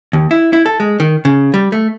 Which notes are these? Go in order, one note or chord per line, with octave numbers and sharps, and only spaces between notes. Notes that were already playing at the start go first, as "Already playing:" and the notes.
D#2
E4
E4
A4
G#3
D#3
C#3
G3
A3